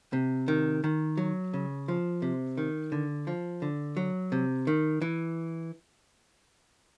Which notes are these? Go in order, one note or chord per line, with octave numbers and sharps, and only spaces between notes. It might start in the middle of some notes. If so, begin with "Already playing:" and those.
C3
D#3
D#3
F#3
C#3
F3
C3
D#3
D3
F3
D3
F#3
C3
D#3
E3